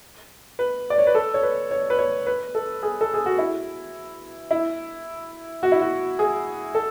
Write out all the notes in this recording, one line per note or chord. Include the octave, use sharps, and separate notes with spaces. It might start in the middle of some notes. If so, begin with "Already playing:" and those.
B4
D5
C#5
B4
A4
C#5
B4
C#5
B4
C#5
B4
A4
G#4
A4
G#4
F#4
E4
E4
F#4
E4
F#4
G#4
A4